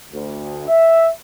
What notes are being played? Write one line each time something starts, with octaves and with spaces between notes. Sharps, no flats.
D2
E5